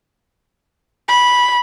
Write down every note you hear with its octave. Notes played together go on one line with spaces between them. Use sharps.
B5